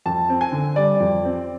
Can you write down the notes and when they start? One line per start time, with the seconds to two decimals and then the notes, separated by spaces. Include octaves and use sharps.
0.06 F2 A5
0.30 C4
0.41 G#5
0.52 D3
0.76 G3 D5
1.00 F2
1.25 C4